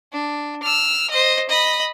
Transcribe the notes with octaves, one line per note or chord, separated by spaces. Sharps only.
D4
E6 F6
C5 D#5
D#5 B5